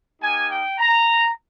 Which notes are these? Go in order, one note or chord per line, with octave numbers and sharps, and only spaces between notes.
A#3 D#4 G4 G#5
G5
A#5